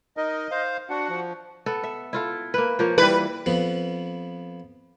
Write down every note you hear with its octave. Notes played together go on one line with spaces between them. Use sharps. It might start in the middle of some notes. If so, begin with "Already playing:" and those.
D#4 A#4 D#5
C5 F5
D4 F#4 F#5
F3
B3 A4
E5
E4 F4 A4
A#3 B4
F3 A#3 C#5
E3 G3 B4
F2 F3 B3 B4